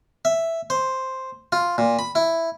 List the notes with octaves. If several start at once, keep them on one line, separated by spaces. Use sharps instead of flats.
E5
C5
F4
A#2
B5
E4